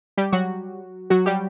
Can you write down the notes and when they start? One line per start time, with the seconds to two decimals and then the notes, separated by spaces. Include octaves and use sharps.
0.17 G3 G4
0.32 F#3 F#4
1.10 F#3 F#4
1.26 G3 G4